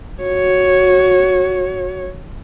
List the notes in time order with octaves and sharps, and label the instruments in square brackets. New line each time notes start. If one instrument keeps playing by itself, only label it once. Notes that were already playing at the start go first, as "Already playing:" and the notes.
[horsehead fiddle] F#4 C#5